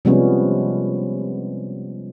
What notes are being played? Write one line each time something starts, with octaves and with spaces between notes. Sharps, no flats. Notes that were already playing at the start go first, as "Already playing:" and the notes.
C3 F3 G3 G#3 B3 C#4